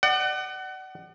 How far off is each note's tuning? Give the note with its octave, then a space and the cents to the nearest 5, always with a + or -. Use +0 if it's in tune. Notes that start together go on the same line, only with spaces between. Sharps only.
D5 +40 F#5 +30